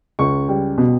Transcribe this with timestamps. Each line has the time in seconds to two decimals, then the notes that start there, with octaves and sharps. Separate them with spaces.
0.19 C#2 C#6
0.49 G3
0.78 B2